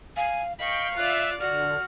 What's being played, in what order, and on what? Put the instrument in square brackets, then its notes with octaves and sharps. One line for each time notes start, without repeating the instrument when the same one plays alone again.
[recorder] F5 [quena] G#5
[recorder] D#5 [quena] F5 [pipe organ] G5 [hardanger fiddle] B5 C#6
[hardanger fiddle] F4 D5 [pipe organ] E5 [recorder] F#6
[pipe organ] D3 [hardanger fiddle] F#4 [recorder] D5 [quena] F6